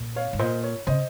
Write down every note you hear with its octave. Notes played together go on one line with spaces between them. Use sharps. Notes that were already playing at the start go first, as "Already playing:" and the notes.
Already playing: A#2
C#5 F5
G#2
A#2 C5 D#5
C#5
C#3 C5 D#5